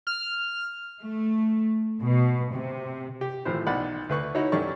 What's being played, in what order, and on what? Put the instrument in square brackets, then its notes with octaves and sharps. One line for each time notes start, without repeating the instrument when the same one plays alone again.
[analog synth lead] F6
[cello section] A3
B2
C3
[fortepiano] G4
G#1 A2 E3 F3 C5
B1 D5 F#5 B5
D2 B4 C#6
D#4 E4 F#4 C#5
F#2 C#4 G4 A4 D5 C#6